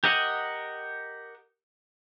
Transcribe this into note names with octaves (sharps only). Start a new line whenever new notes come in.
G4 A#4 D#5 F#5